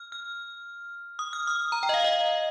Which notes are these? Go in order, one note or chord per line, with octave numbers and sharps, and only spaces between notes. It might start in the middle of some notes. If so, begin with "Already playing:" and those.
Already playing: F6
F6
D#6
F6
D#6
A#5
G5
D#5
F5
D#5